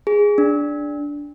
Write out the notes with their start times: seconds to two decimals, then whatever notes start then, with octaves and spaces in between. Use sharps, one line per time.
0.07 G#4
0.38 D4